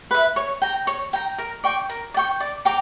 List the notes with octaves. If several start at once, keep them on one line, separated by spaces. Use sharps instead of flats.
B4 E5
C#5
G5 A#5
C#5
G5 A#5
A#4
D5 G5 C#6
A#4
D5
G5 C#6
D5
G5 A#5 D6